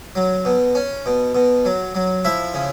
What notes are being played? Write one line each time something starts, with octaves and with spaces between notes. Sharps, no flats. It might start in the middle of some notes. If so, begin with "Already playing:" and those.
F#3
B2
C#4
B2
B2
F#3
F#3
F3 E4 E5
C#3